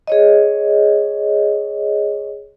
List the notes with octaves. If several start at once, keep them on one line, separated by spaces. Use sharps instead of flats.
G#4 C#5 D#5